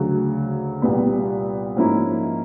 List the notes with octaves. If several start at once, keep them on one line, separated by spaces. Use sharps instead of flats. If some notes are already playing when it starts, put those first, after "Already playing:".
Already playing: D2 C#3 F#3
C2 A#2 G3 B3
G#2 F3 A#3 C#4 E4